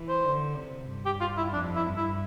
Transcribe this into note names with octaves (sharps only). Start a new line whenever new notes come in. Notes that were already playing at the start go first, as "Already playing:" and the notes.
Already playing: E3
C5
D3
C3
G2
G4
F4
E4
F2 D4
E4
G2
E4